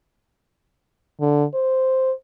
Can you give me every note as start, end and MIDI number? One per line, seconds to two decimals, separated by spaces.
1.20 1.44 50
1.54 2.12 72